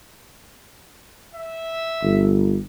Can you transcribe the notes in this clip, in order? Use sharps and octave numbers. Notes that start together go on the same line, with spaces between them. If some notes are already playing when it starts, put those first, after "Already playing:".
E5
G1